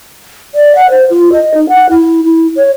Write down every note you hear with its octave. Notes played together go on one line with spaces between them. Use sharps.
D5
F#5
C5
F4
D#5
D#4
F#5
E4
E4
C#5